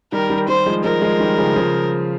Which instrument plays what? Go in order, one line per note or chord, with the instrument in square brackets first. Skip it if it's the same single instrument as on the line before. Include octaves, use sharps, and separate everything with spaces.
[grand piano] D#3 G3 [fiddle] A#4
[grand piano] D#3 G3
[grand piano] D#3 G3 [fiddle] C5
[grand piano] F3 G#3
[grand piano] F3 G#3 [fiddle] A#4
[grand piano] F3 G#3
D#3 G3
C#3 F3
C#3 F3